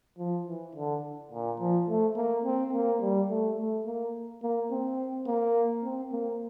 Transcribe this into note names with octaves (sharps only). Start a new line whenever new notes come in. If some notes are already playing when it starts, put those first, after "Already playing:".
F3
E3
D3
A#2
F3
A3
A#3
C4
A#3
G3
A3
A3
A#3
A#3
C4
A#3
C4
A#3